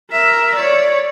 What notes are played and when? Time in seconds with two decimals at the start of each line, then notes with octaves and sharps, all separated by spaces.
0.12 A#4 E5
0.56 C#5 D5